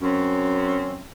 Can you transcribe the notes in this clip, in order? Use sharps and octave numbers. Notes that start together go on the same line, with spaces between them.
F#2 C4 C#4